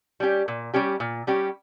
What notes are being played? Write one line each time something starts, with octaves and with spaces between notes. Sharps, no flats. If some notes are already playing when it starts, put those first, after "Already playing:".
G3 C#4 G4
A#2
G3 C#4 G4
A#2
G3 C#4 G4